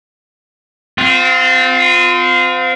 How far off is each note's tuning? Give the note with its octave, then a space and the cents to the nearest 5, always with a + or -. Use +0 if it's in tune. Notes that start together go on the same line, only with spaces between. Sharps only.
C4 -25 F4 +20